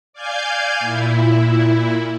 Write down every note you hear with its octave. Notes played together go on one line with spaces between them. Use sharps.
D5 F5 G#5 G6 G#6
A#2 E4